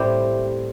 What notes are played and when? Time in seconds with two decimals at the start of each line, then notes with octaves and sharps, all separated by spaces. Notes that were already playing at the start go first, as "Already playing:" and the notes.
Already playing: A2 G3 C4 E4 G4